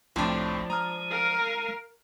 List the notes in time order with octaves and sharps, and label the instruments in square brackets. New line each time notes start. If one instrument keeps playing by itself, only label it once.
[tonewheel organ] C2 [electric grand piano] F2 A2 C3 [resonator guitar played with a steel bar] F3 D4
[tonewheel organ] G#3 [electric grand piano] A#5 D#6 F6
[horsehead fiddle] A#4 F5